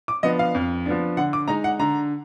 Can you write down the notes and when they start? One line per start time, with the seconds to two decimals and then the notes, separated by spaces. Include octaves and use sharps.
0.08 D6
0.23 F3 B3 D4 D#5
0.39 F5
0.55 F2
0.86 F3 B3 D4
1.17 D3 F#5
1.33 D6
1.48 G#3 D#4 A#5
1.64 F#5
1.79 D3 A#5